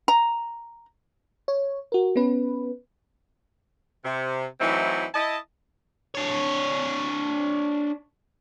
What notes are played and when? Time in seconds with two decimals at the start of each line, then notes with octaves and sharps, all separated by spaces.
0.08 A#5
1.48 C#5
1.92 F#4 A#4
2.16 B3 C#4 B4
4.04 C3
4.60 E3 F#3 A3 C4 D#4 E4
5.14 E4 D#5 A5
6.15 D4 C#5